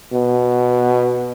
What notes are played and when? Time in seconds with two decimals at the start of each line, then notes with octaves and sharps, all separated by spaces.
0.12 B2